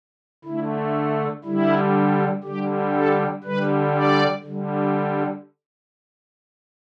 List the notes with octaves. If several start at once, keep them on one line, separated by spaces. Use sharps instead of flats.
D3 A3 E4
D3 G3 E4
D3 G3 G4
A4
D3 G3 B4
D5
D3 G3